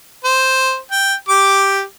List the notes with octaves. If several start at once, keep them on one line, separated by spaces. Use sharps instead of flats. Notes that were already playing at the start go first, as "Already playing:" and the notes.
C5
G5
G4 D6